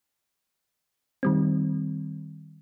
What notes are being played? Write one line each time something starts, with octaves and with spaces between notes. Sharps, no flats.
D#3 G3 C4